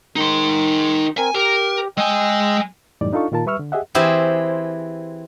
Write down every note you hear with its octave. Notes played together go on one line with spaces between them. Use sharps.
D#3 D#4 C6
C4 A#4 G#5
G4 A#4
G#3 D#5 G5 G#5 E6
F#2 A2 E3 G3 D#4 D5
D4 D#4 F4 A4 F5 C#6
A#2 D#3 F4 A#4 A5
G3 B4 E5 C#6 E6 F6
D3
G4 G#4 D#5 E5 F#5
E3 C4 E4 G4 G#4 C5